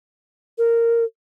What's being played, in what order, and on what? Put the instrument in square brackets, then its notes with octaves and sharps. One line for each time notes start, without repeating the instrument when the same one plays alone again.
[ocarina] A#4